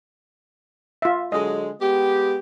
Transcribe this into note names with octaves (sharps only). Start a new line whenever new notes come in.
F4 E5
D3 F#3 G#3 D#5
G#3 B3 G4